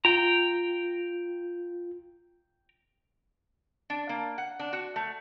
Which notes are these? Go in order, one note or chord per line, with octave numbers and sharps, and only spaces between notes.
F4 G5 A#5
D4
A#3
F#5
D4
F#4
A3